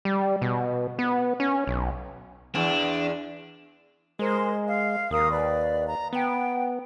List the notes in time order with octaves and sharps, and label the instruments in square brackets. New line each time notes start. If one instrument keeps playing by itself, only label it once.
[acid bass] G3
B2
B3
C#4
B1
[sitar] E2 [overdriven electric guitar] D4
[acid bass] G#3 [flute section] A#4 C5
[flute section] F5
[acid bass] D#2 [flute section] A#4 F5 D#6
[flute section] B4 D5
A#5
[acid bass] B3 [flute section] G5